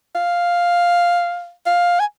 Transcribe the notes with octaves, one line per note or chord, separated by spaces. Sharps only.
F5
F5
G#5